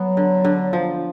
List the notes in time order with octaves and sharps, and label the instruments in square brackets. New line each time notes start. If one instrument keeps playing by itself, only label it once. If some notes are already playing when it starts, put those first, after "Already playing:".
Already playing: [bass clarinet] F#3 [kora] B3
[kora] D3
D3
F3